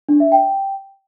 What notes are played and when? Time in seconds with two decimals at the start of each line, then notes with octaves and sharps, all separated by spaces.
0.09 D4
0.20 E5
0.32 G5